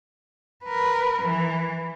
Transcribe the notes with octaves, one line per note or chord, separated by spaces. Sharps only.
A#4 B4
E3